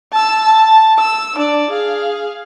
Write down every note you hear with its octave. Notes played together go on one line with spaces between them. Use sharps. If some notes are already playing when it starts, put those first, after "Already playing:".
A5 E6
A5
E6
D4 D5
G#4 F5